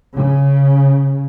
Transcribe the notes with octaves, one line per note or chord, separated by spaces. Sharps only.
C#3